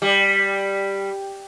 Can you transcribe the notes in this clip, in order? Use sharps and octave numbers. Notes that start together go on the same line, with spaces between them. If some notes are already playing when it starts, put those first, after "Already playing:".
G3